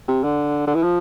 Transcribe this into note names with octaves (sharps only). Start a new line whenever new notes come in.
C3
D3
D3
E3
F3